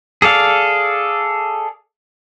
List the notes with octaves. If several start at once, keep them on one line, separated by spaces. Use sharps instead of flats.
G#4 A4 D5 F5